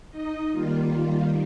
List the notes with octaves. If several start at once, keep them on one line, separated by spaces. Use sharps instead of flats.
D#4 D#5
D#3 G3 A#3 F4